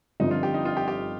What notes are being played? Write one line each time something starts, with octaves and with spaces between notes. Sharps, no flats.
G1 G2 F3 C4 D#4
F4
G4
D#4
F4
G4
G4